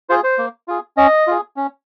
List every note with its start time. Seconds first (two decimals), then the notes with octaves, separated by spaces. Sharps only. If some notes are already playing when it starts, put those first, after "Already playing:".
0.09 F4 G#4 C5
0.24 C5
0.38 A#3
0.68 F4 G#4
0.97 C#4 D#5
1.27 F4 G#4
1.56 C#4